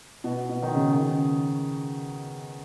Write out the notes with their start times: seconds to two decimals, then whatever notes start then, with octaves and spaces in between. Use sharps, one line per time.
0.24 B2
0.49 B2
0.62 D#3
0.74 C#3
0.93 D#3
1.01 C#3